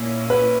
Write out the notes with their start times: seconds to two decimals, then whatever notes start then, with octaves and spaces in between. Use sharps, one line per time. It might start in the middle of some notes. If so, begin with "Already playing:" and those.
Already playing: A#2 A#3 C#4 E4
0.30 B4